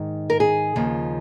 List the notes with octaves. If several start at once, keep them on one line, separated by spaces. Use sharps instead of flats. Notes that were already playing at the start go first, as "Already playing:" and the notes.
Already playing: G#2 D#3
A#4
G#4
D#2 C#3 F3